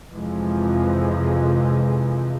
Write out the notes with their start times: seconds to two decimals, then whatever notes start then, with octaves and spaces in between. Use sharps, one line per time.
0.12 F2 C3 E3 F3 G#3